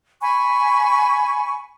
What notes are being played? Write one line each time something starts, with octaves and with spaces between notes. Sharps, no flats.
G#5 B5 C#6